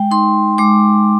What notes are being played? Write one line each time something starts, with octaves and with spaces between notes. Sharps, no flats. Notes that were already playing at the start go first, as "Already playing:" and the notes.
Already playing: G#3 G5
D#4 C6
G#3 D6